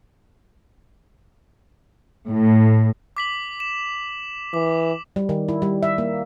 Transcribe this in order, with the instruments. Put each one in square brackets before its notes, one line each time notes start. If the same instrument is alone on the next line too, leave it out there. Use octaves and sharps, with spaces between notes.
[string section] A2
[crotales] D6 B6 F#7
E7
[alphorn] E3 [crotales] D6
[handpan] G3
D#3
E4
G3
E5
A#3